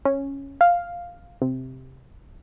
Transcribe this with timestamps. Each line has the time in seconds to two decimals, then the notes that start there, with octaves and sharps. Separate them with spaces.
0.05 C#4
0.61 F5
1.42 C3